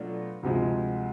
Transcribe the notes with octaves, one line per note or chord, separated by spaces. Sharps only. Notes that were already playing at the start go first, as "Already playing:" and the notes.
Already playing: B2 F#3 A3 D4 F4
D2 C3 F3 G#3